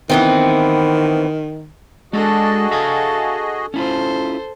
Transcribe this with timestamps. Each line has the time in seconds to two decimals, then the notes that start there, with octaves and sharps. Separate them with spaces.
0.10 D#3 E3 B3 C4
2.13 G#3 D4 F#4 G#4 A4 D#5 A5
2.71 A4 E5 F5 G#5
3.74 C#4 E4 F4 A4 C5